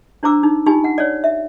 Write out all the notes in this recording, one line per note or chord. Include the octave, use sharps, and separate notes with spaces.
D4 E4 C5 A#5 D6 E6
D#4
D#4 F4 G4 G#5
F#5
C#5 D5
E5